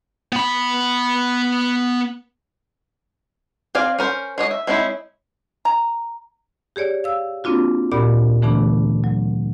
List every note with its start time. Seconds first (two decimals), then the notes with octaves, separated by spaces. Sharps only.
0.33 B3 B5
3.75 C4 D5 F5 G#5
3.99 C#4 A#4 C5
4.38 G#3 C#5 D#5
4.51 E5
4.67 G#3 C4 C#4 D#4 E4
5.65 A#5
6.76 G4 G#4 C#5 D5
7.04 F5 E6
7.44 A#3 C4 D4 F4 F#4
7.92 D2 A#2 G4 D5 B5
8.42 D3 E3 A3 B3 D4
9.04 F#3